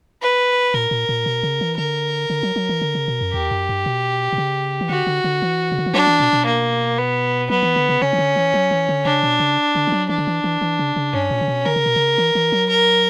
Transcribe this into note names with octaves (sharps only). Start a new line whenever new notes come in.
B4
A#2 A#4
A#2
A#2
B2
C#3
E3
D3 A#4
D3
F#3
F#3
E3
D3
C#3
B2
F#2
E2 G4
F#2
G2
B2
B2
C#3
E3
D3 F#4
D3
D3
E3
C#3
D3
E3
F#3 D4
E3
B2
B2
A#3
B3
F#3 B3
E3
D3
C#3
C#3 C#4
E3
D3
E3
F#3
E3
D3
C#3 D4
B2
C#3
D3
E3
F#3
E3 D4
D3
E3
E3
E3
C#3
C#3
G2 C#4
A#2
C#3
B2
D3 A#4
C#3
B2
C#3
E3
E3
F#3
A#4